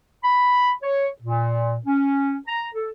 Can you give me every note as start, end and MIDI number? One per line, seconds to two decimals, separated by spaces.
0.24 0.72 83
0.83 1.07 73
1.22 1.77 46
1.86 2.35 61
2.48 2.67 82
2.75 2.91 69